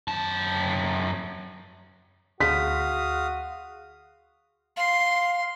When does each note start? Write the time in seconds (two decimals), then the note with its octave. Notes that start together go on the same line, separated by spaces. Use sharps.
0.08 F#2 A5
2.40 D2 F#4 G#4 F5 C6 D#6 B6
4.76 F5 C6